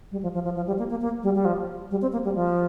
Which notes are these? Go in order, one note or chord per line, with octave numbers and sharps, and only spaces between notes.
G3
F3
F3
F3
F3
G3
A#3
A#3
A#3
G3
G3
F3
G3
C4
A#3
G3
F3